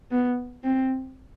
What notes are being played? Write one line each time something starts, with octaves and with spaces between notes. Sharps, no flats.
B3
C4